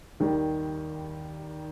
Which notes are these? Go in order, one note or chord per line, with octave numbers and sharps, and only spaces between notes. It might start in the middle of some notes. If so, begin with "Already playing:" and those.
D#2 D#3 G3